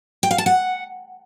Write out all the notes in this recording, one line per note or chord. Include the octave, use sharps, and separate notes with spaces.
G5
F5
A5
F#5